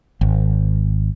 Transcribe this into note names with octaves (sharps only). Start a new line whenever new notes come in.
G#1